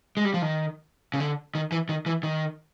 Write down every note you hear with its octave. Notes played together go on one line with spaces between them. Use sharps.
G#3
G3
F3
D#3
C#3
D3
D#3
E3
D#3
E3
D#3